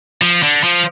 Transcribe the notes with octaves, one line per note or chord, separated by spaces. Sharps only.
F3
D3
F3